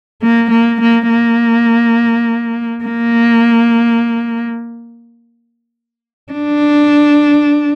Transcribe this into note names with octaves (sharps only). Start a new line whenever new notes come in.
A#3
A#3
A#3
A#3
A#3
D4